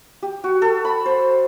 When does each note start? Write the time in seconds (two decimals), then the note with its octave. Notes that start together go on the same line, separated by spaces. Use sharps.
0.23 G4
0.44 F#4
0.62 A4
0.85 B5
1.06 C5